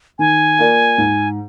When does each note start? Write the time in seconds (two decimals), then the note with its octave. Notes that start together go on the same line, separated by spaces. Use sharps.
0.19 D#3 G#5
0.59 A#3 F4 A#4 D5
0.98 G#2